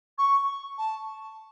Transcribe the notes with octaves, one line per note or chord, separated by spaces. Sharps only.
C#6
A5